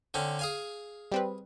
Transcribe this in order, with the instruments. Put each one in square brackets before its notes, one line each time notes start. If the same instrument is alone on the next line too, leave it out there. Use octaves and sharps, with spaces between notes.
[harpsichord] D3 C4 C#4
G#4 F5 G#5
[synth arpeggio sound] G3 C4 B4